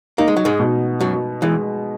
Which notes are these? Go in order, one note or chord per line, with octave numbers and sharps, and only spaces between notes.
A#3 D#4
G#3
F#3
G#2 G#3
B2
F#2 F#3 F#4
E2 E3 G#3